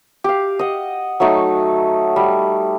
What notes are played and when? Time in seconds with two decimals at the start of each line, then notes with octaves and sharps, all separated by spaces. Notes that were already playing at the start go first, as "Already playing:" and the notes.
0.24 G4 F5
0.59 D#5 F#5
1.20 F#3 A3 D#4 C#6
2.16 G3